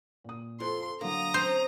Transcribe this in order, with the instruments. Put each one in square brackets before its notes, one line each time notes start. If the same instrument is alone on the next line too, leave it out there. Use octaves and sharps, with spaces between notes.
[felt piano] A#2 D#6
[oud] F2 [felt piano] F4 C5 [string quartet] C6
[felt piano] D3 F#3 [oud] A#3 [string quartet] A#5 D#6
[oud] C4 C#4 [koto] C5